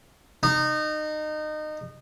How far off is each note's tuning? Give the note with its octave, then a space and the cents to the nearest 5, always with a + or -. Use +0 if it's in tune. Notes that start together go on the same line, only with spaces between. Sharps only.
D#4 -25